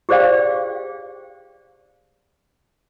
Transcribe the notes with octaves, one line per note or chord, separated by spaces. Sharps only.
G4 G#4 C5 D5 F5 G5